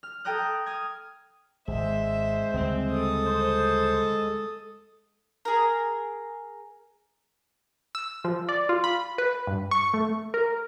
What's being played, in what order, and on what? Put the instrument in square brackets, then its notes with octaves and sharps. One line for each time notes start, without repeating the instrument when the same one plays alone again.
[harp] F6
A4 G5 A#5 D#6 F#6
D#6 F6 G#6
[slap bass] G#1 [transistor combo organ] G#3 [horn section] C5 [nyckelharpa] E5
[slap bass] D2 C#3 G3 [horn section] C4
[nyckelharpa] A4 D#6
[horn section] C5
[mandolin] G#4 A#4
[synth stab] E6
F3
D5
F4
B5
B4
G2
C#6
A3
A#4